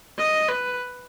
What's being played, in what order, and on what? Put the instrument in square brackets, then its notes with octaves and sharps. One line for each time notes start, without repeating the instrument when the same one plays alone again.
[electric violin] D#5
B4